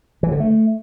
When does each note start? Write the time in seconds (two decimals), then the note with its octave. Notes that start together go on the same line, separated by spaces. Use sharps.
0.23 E3
0.32 D3
0.40 A3